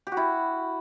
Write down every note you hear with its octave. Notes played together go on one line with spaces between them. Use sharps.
G4
F#4
E4